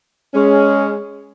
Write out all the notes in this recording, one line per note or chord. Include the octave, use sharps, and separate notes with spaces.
G#3 C#4